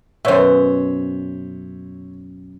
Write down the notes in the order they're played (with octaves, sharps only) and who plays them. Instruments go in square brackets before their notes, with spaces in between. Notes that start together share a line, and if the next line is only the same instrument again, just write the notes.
[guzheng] F#2 B2 [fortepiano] C5 C#5 E5